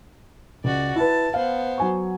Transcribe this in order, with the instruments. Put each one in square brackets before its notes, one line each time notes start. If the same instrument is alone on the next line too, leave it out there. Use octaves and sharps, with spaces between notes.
[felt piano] C#2 [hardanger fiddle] F#4 D5
[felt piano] E4 B4 [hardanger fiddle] A5
[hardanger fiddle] B3 C5 [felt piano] F5
[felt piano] F#3 G#5 C#6